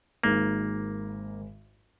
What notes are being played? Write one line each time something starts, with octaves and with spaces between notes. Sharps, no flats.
G#1 G#2 G#3 A#3